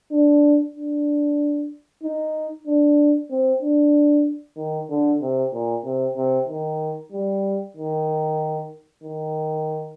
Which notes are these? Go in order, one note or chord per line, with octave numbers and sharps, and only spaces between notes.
D4
D4
D#4
D4
C4
D4
D#3
D3
C3
A#2
C3
C3
D#3
G3
D#3
D#3